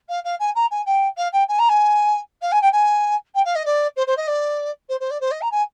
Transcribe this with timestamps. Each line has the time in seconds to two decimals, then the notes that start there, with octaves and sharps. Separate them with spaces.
0.08 F5
0.24 F5
0.39 G#5
0.55 A#5
0.71 G#5
0.85 G5
1.17 F5
1.32 G5
1.48 G#5
1.59 A#5
1.69 G#5
2.41 F5
2.52 G#5
2.61 G5
2.72 G#5
3.34 G5
3.45 F5
3.55 D#5
3.65 D5
3.96 C5
4.07 C5
4.17 D#5
4.27 D5
4.89 C5
5.00 C5
5.10 D5
5.20 C5
5.31 D#5
5.41 A#5
5.51 G#5